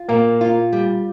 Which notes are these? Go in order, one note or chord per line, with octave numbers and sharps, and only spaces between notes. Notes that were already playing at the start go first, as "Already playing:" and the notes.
Already playing: F4
A#2 A#3
F4
G3